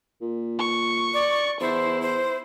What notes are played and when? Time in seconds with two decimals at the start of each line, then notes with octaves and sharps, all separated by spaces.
0.22 A#2
0.59 C#6
1.14 D5
1.61 E2 E4 C5
2.02 C5